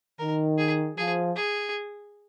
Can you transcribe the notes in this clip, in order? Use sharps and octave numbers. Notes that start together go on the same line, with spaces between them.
D#3 A#4
G#4
F3 G#4
G#4